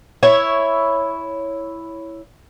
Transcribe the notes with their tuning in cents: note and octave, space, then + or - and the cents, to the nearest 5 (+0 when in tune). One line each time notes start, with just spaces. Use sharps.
E4 +0 C#5 +0 E5 +0